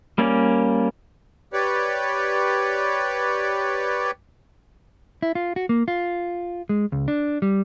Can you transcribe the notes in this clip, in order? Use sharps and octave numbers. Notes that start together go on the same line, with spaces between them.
G3 A#3 C#4 D5
G4 B4 C#5 D5
E4
F4
F#4
A#3
F4
G#3
C#2
D4
G3